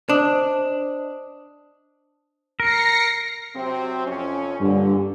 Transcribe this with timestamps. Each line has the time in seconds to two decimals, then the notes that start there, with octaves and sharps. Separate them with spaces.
0.09 D4 C5 D#5 D#6
2.60 A#4 A#6 C7 C#7
3.54 C3 F#3 C4
4.05 F2 C#4
4.60 G2 A#2 D3